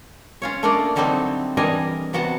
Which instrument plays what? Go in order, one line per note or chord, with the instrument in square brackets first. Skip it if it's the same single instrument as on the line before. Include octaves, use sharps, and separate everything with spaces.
[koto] C#4 F4 C#5
A3 A#3 D4 F4 D5 D#5
D3 F#3 G3 A3 C4 D#4
E3 G3 D4 A#4 D#5 G#5
C3 B3 F#4 F#5 A5